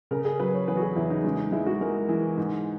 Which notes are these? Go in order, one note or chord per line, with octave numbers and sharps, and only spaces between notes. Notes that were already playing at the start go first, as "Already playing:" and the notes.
C#3 A#4
G#4
F#3 B4
C#5
E2 B4
F#4
G#4
E2 E4
D#4
G#3 C#4
D#4
G#3 E4
F#4
G#3 A#4
E3
G#2